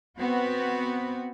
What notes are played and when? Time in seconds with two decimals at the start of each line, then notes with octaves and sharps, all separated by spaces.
0.18 B3 C4 F#4 B4